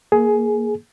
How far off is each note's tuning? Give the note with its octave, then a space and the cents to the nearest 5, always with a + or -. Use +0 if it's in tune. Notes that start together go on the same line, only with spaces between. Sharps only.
A#3 +0 G#4 +15